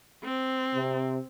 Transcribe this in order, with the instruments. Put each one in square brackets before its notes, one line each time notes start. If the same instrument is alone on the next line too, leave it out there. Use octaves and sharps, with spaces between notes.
[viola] C4
[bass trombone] C3